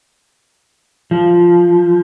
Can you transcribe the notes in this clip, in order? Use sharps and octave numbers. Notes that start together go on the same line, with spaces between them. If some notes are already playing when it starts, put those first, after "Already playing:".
F3